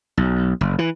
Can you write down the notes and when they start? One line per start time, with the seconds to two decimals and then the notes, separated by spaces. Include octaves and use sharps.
0.17 B1
0.61 F#1
0.79 E3